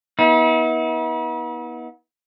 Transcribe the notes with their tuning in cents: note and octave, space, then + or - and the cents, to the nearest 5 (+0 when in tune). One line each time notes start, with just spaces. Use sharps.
B3 -30 E4 -45